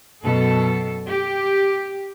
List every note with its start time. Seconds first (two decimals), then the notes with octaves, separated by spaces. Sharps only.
0.24 F#2 B2 A4
1.07 G4